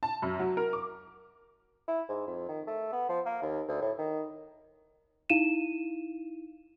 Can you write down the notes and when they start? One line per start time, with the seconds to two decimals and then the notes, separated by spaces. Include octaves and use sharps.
0.03 A5
0.22 F#2
0.39 F#3
0.57 A#4
0.73 D6
1.88 E4
2.09 G#2
2.27 F2
2.49 D#3
2.67 A3
2.93 B3
3.09 F3
3.26 A#3
3.42 D#2
3.69 D2
3.82 A2
3.98 D#3
5.30 D#4 E4 F5 D#7 E7